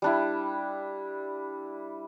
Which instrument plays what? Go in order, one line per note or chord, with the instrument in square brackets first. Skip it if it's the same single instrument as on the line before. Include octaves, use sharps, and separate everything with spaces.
[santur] G3 D4 E4